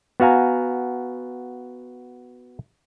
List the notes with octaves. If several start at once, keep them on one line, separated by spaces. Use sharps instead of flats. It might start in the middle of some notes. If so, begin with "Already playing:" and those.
B3 F#4 F5 G#5 A#5